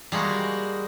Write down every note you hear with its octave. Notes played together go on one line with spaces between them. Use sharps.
G3 G#3 A#3 F#4